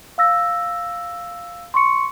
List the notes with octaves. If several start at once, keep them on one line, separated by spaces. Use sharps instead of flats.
F5 E6 A#6
C6 C#6 C#7